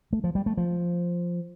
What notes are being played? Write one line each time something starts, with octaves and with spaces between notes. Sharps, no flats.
A3
F3
G3
A3
F3